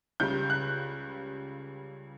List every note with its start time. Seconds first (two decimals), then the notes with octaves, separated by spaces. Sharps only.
0.20 C#2 C#3 G3 G6
0.50 F#6